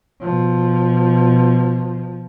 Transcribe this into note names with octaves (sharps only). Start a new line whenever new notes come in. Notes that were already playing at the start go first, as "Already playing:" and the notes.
B2 F3